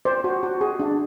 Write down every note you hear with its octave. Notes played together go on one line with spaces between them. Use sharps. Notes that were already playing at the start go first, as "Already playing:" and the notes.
C5 D5
F#4
F#4
G#4
D4